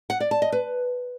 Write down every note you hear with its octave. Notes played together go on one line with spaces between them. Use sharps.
F#5
D5
A5
D#5
B4